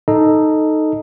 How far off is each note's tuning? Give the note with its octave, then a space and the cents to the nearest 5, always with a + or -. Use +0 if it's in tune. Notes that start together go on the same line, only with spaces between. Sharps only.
D#4 +0 A4 +0 D#5 +0